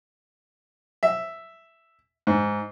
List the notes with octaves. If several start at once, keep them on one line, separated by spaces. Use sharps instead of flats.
E5
G#2